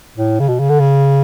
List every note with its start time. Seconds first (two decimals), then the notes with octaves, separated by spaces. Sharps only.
0.17 A2
0.40 C#3
0.49 B2
0.59 C#3
0.69 D3
0.79 C#3